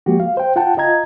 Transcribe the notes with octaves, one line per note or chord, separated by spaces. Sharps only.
F3 G#3 A#3 F#4 G4
F5
C5 G5
F4 F#5 G5 A5
F4 D#5 A#5 G#6